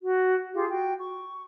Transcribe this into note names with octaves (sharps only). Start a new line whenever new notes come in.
F#4
F4 G4 G#4 F5
F#4 G5
C#6